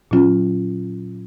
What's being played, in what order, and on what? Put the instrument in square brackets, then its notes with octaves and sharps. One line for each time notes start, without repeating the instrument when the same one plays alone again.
[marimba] A#2 F#3 C#4 F4